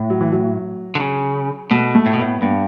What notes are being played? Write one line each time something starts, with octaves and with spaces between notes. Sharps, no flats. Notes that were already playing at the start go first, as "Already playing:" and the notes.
Already playing: A2
F#3
E3
F#3
D3
C#3
B2 A3
A3
A2
B2
A2 B3
G2 B3